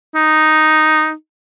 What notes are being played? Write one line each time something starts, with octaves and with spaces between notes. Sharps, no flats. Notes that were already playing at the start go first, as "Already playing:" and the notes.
D#4